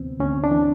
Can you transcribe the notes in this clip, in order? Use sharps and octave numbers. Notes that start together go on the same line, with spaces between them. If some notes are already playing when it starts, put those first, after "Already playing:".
Already playing: D2 C3 E3 B3 C4
D2 C#4
D4
E3